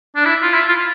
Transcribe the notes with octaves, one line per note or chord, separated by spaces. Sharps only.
D4
E4
F4
E4
F4